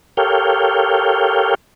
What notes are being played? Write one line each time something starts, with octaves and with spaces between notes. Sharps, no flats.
G4 A4 A#4 C#5 F5 G5